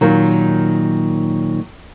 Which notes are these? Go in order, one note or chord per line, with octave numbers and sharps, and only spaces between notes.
A#2 D#3 F#3